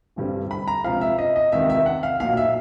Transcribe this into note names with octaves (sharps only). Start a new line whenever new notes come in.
A1 G2 D3 G3 C4
B5
A#5
C#2 C3 F3 F5
E5
D#5
D#5
C#2 C3 D#3 E5
E5
F#5
F5
B1 A#2 F#3 F5
E5